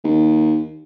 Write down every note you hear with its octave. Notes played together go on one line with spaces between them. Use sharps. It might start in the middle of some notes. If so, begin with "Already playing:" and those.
D#2